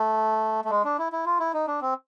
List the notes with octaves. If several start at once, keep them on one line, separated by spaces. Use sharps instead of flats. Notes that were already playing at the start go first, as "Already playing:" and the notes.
Already playing: A3
A3
G#3
D4
E4
E4
F4
E4
D#4
D4
C4